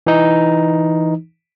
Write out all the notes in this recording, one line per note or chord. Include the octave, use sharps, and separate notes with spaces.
E3 D#4